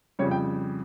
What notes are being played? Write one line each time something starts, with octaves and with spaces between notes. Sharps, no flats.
F2 C#3 G3 C#5
G5